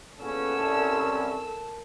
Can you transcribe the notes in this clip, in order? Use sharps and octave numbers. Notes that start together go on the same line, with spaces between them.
E2 A#2 B3 C#4 A4 E6
C2 A#4 A5